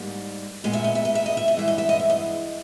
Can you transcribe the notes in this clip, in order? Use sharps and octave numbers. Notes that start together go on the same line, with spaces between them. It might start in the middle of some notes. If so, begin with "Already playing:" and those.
Already playing: G#2 G3 A#3
A#2 G#3 B3 D#5
E5
D#5
E5
D#5
E5
D#5
E5
D#5
G2 E3 G#3 B3 E5
D#5
E5
D#5
E5
D#5